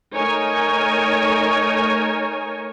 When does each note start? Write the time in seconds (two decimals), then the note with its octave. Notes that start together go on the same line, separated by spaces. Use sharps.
0.14 A3 D#4 A#4 C#5 G#5